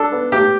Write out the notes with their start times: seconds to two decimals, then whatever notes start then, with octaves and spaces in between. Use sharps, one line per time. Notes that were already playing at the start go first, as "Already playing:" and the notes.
Already playing: D4 A4
0.12 B3
0.32 A2 G4